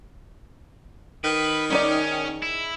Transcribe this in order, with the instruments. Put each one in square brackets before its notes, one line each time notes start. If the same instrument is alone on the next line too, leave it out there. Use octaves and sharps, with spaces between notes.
[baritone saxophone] D#3 [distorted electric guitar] B4
[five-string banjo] G#3 D#4 D5 [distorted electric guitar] C#4
[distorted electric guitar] E4